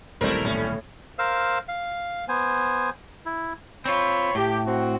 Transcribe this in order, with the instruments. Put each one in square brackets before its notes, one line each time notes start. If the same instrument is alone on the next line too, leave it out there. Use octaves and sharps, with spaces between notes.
[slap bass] D#1 B1 D3 [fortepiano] G3 A3 C4 [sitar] E4 A#4
[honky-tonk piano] A2 [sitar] C#4
[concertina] A#4 C5 F5 E6
F5
B3 C5 G#5
E4
[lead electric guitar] C4 F4 [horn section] C#5 B5
[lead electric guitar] A2 [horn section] G4
[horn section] C4 F#4